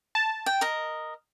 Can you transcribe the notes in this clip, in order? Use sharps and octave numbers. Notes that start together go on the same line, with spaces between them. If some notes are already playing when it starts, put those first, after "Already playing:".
A5
G5
A#4 D#5